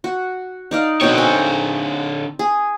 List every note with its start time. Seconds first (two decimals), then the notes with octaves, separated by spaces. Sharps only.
0.04 F#4
0.71 D#4 D5 F5
1.01 B2 D3 C4 C#5
1.18 A#4 G#5
2.39 G#4